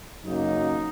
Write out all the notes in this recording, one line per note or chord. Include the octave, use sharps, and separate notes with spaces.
F#2 C#3 F#3 A#3 D#4